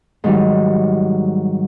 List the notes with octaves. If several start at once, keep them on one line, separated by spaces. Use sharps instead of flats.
G#2 D#3 F#3 G3